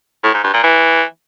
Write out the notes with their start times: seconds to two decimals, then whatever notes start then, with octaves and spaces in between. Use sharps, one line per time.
0.24 A2
0.34 G#2
0.44 G2
0.53 A#2
0.63 E3